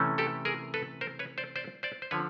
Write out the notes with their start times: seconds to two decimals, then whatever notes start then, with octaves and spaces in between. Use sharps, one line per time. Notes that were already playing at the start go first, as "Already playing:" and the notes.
Already playing: C3 E3 A3 C#4
0.18 G4 A4
0.45 G#4 A#4
0.74 A4 B4
1.01 A#4 C5
1.19 B4 C#5
1.38 C5 D5
1.56 C5 D5
1.83 C5 D5
2.02 C5
2.11 D3 F3 B4 C#5